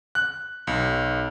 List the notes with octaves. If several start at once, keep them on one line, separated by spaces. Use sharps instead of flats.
F#6
B1